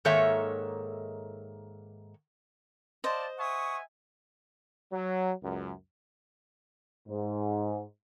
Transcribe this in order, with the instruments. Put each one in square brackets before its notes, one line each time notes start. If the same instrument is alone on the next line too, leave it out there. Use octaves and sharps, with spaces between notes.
[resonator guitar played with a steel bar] G#2 D#3 A#3 A4 C#5 E5
[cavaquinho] C5 D#5 [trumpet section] D5 F5 A5
[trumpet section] E5 F#5 G#5 [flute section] C#6 D#6
[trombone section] F#3
C#2 F#2
[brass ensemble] G#2